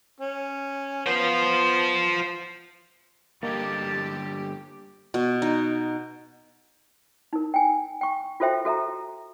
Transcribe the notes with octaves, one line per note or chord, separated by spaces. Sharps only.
C#4
B3 F4 C5
G2 D3 A#3 G4 D#5 A5 G#6
B2
D#4
D#4 A#4
G5 G#5
G5 C#6
F4 F#4 A4 C5 E5 G5
F#4 A4 E5 A#5